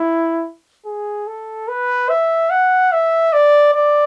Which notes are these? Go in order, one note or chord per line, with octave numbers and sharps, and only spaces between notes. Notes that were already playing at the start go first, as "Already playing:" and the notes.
Already playing: E4
G#4
A4
B4
E5
F#5
E5
D5
D5